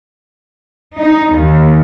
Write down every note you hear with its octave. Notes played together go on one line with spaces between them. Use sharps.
D#4
D#2